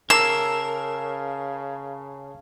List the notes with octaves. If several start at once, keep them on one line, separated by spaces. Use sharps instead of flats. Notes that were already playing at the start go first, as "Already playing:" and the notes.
C#3 A#4 A5 E6 C7